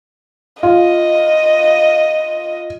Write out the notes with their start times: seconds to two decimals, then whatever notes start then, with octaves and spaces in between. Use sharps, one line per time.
0.63 F4 D#5